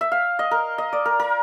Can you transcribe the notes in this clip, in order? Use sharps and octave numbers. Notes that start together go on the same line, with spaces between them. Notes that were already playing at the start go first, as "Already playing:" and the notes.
E5
F5
D#5
A#4
D#5
D5
A#4
A#4